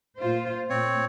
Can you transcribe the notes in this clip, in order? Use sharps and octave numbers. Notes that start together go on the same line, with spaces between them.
A#2 F4 C5
A#2 C4 C#5